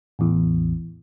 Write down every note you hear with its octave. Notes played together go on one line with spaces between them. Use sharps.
A1 E2